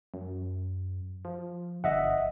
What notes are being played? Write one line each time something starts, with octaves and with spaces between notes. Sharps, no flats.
F#2
F3
G1 D#5 E5 F#5